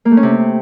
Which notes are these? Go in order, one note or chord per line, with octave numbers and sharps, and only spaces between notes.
A#3
A3
C#4
C3